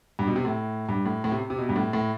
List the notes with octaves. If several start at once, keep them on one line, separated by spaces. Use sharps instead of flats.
G2
B2
C3
A2
G2
A2
A2
C3
C3
B2
G2
A2
A2